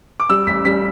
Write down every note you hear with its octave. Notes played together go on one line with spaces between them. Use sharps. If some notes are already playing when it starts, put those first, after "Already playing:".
D6
G3 E6
A1 B6
G3 B6